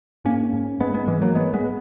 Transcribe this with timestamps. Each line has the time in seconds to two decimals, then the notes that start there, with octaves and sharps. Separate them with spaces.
0.25 G#2 A#3 C#4
0.53 G#2
0.80 G#2 G#3 B3
0.94 G#3 B3
1.07 G#2 E3 G#3
1.22 F#3 A#3
1.35 G#2 G#3 B3
1.54 G#3 B3